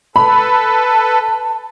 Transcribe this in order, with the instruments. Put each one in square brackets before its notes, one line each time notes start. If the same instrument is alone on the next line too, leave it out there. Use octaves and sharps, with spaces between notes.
[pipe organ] A4 B4 [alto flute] A5 [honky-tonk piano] B5